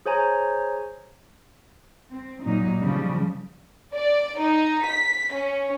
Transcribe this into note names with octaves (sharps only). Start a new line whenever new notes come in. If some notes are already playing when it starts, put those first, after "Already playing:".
G#4 C5 C#5 G#5 A#5
C4
A#2 F#3 D#4
C#3 F3 G3
D5
D#4
B6
C#4